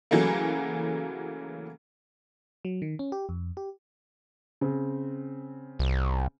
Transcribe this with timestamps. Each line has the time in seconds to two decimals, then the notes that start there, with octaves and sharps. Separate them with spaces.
0.11 C#3 E3 F#3 A3 A#3
2.65 F#3
2.82 D#3
2.99 C#4
3.12 G4
3.29 F2
3.57 G4
4.61 C#3 C4
5.79 C2